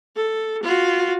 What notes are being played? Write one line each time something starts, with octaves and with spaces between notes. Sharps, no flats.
A4
F4 F#4